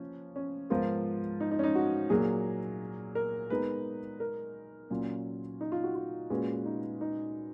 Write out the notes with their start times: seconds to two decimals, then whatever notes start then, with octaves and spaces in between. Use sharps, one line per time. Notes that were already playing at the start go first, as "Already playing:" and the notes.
Already playing: F3 A#3 C#4
0.36 C#4
0.70 G#2 F3 B3 F4 A#4
1.40 D#4
1.51 D#4
1.59 C#4
1.64 D#4
1.75 F#4
2.10 A#2 F#3 A#3 G#4
3.15 A#4
3.50 G#3 B3 D#4 A#4 B4
4.20 A#4
4.90 A#2 F#3 C#4 F4
5.61 D#4
5.72 F4
5.83 F#4
5.95 F4
6.30 A#2 G#3 C#4 F#4 B4
6.66 D#4
7.01 D#4